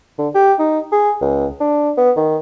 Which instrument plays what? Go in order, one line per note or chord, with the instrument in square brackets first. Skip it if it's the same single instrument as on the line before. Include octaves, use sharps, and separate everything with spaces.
[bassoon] D3
G4
D#4
G#4
C#2
D4
B3
D#3